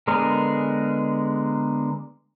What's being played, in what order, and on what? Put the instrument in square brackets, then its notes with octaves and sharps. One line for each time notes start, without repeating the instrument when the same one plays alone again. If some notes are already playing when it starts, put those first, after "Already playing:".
[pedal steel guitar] D3 G#3 B3 G#4 A#4